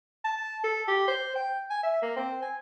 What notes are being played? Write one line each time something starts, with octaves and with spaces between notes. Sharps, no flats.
A5
A4
G4
C5
G5
G#5
E5
A#3
C4
G#5